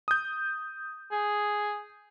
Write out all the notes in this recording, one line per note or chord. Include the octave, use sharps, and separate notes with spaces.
D#6 G6
G#4